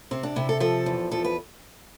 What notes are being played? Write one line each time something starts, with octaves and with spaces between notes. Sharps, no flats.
C3 C4
D4
C3 E4
A4
F3 A4
E2
F3 A4
B4